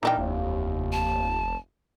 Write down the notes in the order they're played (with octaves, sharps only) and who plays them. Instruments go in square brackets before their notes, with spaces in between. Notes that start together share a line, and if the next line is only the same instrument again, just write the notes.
[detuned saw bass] A#2 [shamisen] E3 D4 G5 [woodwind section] D#4 A#4
[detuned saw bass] F1 [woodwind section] D#2
[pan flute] A5